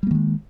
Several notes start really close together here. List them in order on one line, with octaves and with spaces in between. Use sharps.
G3 A#3 D#3 G#3